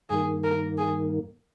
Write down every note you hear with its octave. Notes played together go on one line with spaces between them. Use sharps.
G2 D#3 A#3 G#4
A#4
G#4